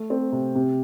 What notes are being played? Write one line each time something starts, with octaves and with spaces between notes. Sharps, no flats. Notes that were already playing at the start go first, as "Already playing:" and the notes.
Already playing: A3
C4
C3
C3